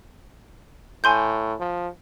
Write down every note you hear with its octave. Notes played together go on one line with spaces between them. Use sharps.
A2 G#5 C6 G6
F3